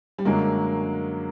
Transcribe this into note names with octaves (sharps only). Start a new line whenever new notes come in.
G3
F#2 D3 F#3 G#3 A#3